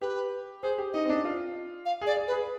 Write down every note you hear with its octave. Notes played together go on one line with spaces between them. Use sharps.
G4 B4
G#4 C5
G4
D#4 D#5
C4
D4
F4
F5
G#4
D5
G#4
B4
G#4